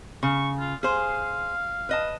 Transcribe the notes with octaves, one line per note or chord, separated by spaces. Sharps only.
C#3 C#6
F4
G#4 C5 F5
B4 D#5 A5